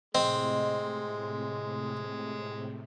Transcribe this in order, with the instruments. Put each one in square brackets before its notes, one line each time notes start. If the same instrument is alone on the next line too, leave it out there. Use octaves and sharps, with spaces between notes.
[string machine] A2 C3 [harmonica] G#3 [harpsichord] C4 [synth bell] D#5